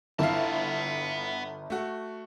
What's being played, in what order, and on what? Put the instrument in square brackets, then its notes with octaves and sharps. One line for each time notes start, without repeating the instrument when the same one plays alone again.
[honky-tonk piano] G1 [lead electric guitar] B3 A5 [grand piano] E4 F5
[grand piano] A3 F#4